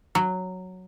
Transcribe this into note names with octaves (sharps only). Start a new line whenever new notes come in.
F#3